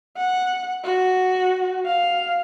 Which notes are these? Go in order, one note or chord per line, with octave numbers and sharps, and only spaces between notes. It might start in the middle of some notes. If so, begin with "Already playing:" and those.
F#5
F#4
F5